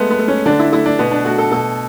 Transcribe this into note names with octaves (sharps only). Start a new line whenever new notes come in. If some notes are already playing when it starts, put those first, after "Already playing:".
Already playing: G#3 A3 B3
B3
A3
C#4
D3 D4
E4
A3 E4
D4
B2 B3
D4
A3 F#4
A4
B2 A4